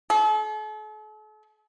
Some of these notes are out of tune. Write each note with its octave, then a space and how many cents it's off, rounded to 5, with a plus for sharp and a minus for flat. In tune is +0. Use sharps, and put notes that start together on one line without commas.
A4 -45